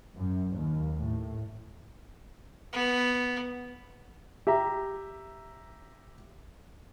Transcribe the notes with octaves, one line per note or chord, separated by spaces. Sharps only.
F#2
D#2
A2
B3
G4 E5 A#5